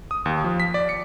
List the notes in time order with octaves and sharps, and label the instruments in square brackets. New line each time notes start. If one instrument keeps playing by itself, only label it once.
[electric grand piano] D#6
D#2
F3
B6
D5
C#7